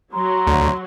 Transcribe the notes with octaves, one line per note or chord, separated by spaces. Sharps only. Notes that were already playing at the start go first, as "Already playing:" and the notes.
F#3 A#5 C6
D2